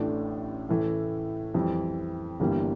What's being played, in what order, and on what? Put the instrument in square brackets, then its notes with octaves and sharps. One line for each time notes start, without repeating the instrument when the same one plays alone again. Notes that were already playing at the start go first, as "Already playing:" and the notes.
Already playing: [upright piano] A1 A2 E3 A3 D4
A2 E3 A3
F2 E3 G3 C4
G1 G2 E3 G3 A#3